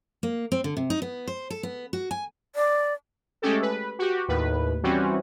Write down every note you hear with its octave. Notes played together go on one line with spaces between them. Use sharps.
A#3
C4
D3
C3
D#4
B3
C5
A4
B3
F#4
G#5
D5
G#3 A3 C#4 G4 A4
B4
F#4 G4
D#2 A2 B4
E3 G3 C4 C#4 F#4